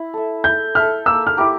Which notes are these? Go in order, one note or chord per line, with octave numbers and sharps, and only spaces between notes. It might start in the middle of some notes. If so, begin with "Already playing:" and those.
Already playing: E4
A4 E5
E4 G6
A4 E5 F6
A#3 E6
F6
E4 G4 A#4 D6